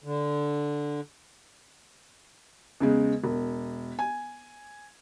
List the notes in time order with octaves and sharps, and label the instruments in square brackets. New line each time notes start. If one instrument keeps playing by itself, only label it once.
[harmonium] D3
[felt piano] E2 C#3 G#3
E1
G#5